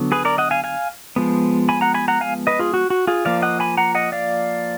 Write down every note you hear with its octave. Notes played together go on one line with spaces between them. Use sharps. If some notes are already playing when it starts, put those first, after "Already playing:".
Already playing: D3 F#3 B3
G#4 B4
A#4 D5
D#5 F#5
F5 G#5
F5 G#5
F3 G#3 B3
G#5 B5
F#5 A#5
G#5 B5
F#5 A#5
F5 G#5
B4 D#5
F4 G#4
F#4
F#4
F4 G#4
F3 A#3 D5 F5
D#5 F#5
G#5 B5
F#5 A#5
D#5 F#5
D5 F5